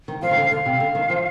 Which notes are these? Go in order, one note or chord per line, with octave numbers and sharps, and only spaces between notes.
D#3
F3 F5
D#3
D3
D3 F5
C3
D3
D#3
F3